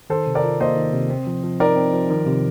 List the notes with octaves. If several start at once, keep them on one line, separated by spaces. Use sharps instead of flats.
D#3 A4 C5
C3
A#4 D5
F4
A#3 C5 D#5
D#3
C3
C4
F3
F3
D#4 A#4 D5
C4
F3
D#3
C3